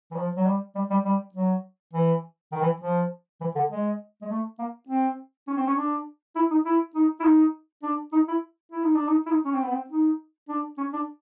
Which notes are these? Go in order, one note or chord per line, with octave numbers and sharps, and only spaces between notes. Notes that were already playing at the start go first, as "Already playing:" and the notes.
E3
F3
F#3
G3
G3
G3
G3
F#3
E3
D#3
E3
F3
E3
D3
G#3
G#3
A3
A#3
C4
C#4
C4
C#4
D4
E4
D#4
E4
D#4
E4
D#4
D4
D#4
E4
E4
D#4
D4
D#4
E4
D#4
C#4
C4
B3
C4
D#4
D4
C#4
D4